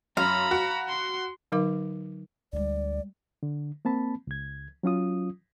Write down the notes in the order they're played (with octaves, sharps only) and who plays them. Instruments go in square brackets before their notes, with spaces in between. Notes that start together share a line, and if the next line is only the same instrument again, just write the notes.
[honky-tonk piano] F#2 [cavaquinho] F5 [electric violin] A#5 B5
[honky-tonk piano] F#4
[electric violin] C6
[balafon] D3 F#3 D#4 A#4 F5 D6
[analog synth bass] D2 [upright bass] G3 G#3 [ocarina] D5
[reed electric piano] D3
A#3 C4 A5 B5
C#2 G#6
F#3 C#4 F4 D#6